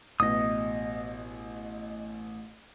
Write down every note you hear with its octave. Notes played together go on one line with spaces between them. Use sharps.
A1 B2 D#5 D#6